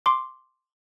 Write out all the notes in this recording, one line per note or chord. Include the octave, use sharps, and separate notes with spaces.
C6 D6